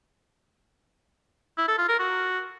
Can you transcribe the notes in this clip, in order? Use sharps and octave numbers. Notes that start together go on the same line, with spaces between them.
E4
A4
F4
A#4
F#4